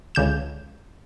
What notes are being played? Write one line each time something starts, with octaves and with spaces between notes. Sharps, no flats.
C#2 D3 G6 E7